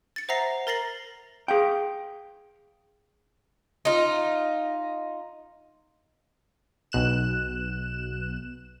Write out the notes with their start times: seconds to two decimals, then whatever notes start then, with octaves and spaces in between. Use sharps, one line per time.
0.16 A6 C#7
0.29 C5 E5 F#5 A#5 A#6 C7
0.67 A#4 A#5 A6 A#6 C7 F#7
1.48 G#4 F5 G5
3.85 D#4 F4
6.92 B1 B2 F#6 E7